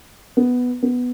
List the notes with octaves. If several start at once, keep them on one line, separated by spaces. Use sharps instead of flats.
B3
B3